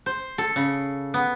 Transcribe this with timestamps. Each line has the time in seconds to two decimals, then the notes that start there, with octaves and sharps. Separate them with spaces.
0.06 C5
0.38 A4
0.56 C#3
1.14 B3